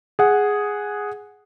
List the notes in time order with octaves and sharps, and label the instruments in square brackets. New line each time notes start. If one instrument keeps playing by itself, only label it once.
[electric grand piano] G#4 F#5